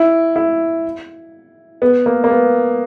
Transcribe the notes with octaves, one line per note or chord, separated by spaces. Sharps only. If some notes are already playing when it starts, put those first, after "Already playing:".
Already playing: E4
E4
B3
A#3
A#3
B3